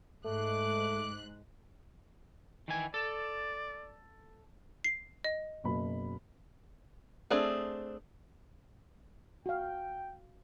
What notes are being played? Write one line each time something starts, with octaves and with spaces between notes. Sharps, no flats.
G#2 A3 D6 F#6
D#3 E3 G#5
A4 D5
C7
D#5
F#1 B2 B5
A3 C4 D4 G#4
F#4 F5 G5